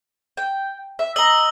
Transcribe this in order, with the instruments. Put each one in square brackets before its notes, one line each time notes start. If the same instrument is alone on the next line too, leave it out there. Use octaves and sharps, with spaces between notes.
[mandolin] G5
E5
[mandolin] D#5 A#5 [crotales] E6 F#7 G7